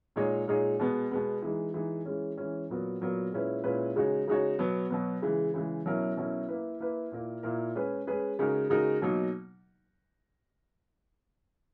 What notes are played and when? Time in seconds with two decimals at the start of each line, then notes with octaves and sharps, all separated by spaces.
0.16 A#2 G#3 D#4 G#4 C#5
0.47 A#2 G#3 D#4 G#4 C#5
0.80 B2 G#3 B3
1.11 B2 G#3 B3
1.42 E3 G#3 D#4
1.74 E3 G#3 D#4
2.06 E3 G#3 C#4
2.38 E3 G#3 C#4
2.70 A#2 F#3 B3 F#4 A#4
3.01 A#2 F#3 B3 F#4 A#4
3.32 A#2 G#3 C#4 E4 B4
3.64 A#2 G#3 C#4 E4 B4
3.96 C#3 G#3 D#4 F#4 C#5
4.28 C#3 G#3 D#4 F#4 C#5
4.59 B2 F#3 B3
4.90 B2 F#3 B3
5.22 C#3 E3 G#3
5.54 C#3 E3 G#3
5.86 B2 F#3 C#4 E4 A#4
6.17 B2 F#3 C#4 E4 A#4
6.49 A#3 E4 B4
6.80 A#3 E4 B4
7.12 A#2 A#3 E4 A#4
7.43 A#2 A#3 E4 A#4
7.75 G#3 C#4 G#4 B4
8.07 G#3 C#4 G#4 B4
8.39 C#3 G#3 D#4 F#4 A#4
8.70 C#3 G#3 D#4 F#4 A#4
9.02 B2 F#3 A#3 D#4 F#4